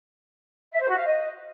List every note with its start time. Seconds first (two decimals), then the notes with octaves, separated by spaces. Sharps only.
0.73 E5
0.81 C5
0.89 F#4
0.97 F5
1.05 D#5